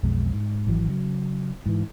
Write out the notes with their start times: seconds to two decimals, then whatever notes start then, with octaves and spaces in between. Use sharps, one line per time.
0.03 B1 F2 B2 G#3
0.33 G#2
0.67 G#1 E3 F#3
0.88 C#3 F#3
1.66 G#2 E3